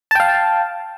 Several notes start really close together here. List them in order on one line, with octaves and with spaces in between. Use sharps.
A5 G5 F5